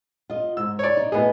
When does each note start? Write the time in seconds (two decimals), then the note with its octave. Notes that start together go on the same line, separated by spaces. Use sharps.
0.30 F4 D#5
0.57 G#2 E6
0.79 C#5 D5
0.97 D#4
1.12 A2 B3 G#4 D#5